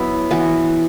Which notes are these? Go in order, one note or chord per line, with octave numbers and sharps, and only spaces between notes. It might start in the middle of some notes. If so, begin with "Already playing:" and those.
Already playing: F#3 B3 E4
E3 B3 F#4